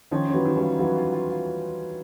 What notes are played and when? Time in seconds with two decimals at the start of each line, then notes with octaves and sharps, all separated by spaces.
0.11 D#3 F3 C#4
0.28 C#4
0.34 E3 F#3
0.45 D#3
0.56 F3 G3
0.63 F4
0.79 E3 F#3 F4
0.96 F4
1.13 F4
1.30 F4